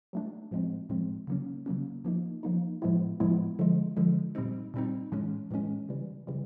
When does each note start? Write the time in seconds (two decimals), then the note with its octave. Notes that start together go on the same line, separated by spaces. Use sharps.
0.13 F#3 A3 D4
0.51 A2 F3 G#3 C4
0.89 A2 F3 G#3 C4
1.27 C#3 F#3 A#3 C#4
1.66 C#3 F#3 A#3 C#4
2.05 F3 A#3 D#4
2.43 F3 A#3 D#4
2.82 A2 F3 G#3 B3 E4
3.20 A2 F3 G#3 B3 E4
3.59 D3 F3 G#3
3.97 D3 F3 G#3
4.35 A#2 G3 C4 D#4
4.74 A#2 G3 C4 D#4
5.12 A2 E3 G#3 C#4
5.51 A2 E3 G#3 C#4
5.89 C#3 E3 G3
6.27 C#3 E3 G3